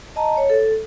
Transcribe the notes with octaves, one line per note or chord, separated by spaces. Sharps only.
D#5 A5 A#5
C#5
A4